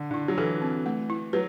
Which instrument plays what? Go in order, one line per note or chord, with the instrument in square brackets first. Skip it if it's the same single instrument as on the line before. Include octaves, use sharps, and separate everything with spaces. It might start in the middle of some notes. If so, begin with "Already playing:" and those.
Already playing: [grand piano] D3
[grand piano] D3 [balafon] E4
[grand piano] F#3
[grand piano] E3 [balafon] A4
[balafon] C4
A3
E4
[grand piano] F#3 [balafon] B4